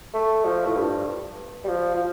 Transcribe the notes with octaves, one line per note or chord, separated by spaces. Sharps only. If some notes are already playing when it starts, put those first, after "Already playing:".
A3
F3
A2
G2
G3
F3
F3